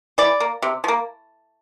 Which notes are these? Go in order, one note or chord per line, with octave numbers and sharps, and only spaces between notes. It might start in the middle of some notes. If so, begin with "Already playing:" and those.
E3 D5
A#3
C3
F3
A#3